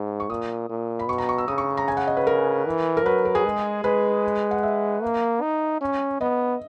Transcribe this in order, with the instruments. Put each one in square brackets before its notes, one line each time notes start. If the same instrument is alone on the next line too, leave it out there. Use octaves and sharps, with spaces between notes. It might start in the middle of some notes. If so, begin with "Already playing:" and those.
Already playing: [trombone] G#2
[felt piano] C#6
[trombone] A#2 [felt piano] D#6
[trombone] A#2
[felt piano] B5
[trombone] B2 [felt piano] C#6
[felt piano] A#5
C#6
E6
[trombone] C#3 [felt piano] D#6
[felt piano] C#6
A#5
G#5
F#5
D#5
B4
A#4
[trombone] E3
[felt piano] A#4
[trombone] F#3 [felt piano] B4
[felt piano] A#4
G#4
[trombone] G#3
[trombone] G#3 [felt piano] B4
[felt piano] F#5
E5
[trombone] A#3
D#4
C#4
[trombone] B3 [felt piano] D#5